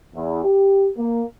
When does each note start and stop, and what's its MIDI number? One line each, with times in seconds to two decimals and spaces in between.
0.15 0.41 40
0.44 0.89 67
0.98 1.23 58